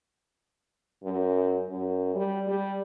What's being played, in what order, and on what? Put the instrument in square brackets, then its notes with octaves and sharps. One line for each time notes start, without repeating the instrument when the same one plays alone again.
[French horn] F#2
F#2
G3
G3